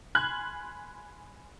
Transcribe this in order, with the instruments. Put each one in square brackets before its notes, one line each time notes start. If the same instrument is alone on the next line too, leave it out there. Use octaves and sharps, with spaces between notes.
[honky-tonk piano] G#5 B5 C6 F6 F#6 G#6